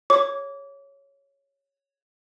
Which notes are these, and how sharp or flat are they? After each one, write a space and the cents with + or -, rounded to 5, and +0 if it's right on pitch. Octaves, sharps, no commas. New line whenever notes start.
C#5 +0 D6 -30